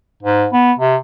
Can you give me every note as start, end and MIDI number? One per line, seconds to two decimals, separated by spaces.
0.23 0.47 44
0.53 0.73 59
0.79 0.96 48